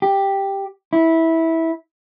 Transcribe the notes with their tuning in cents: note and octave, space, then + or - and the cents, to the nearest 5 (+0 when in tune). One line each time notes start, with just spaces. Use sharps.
G4 +5
E4 -15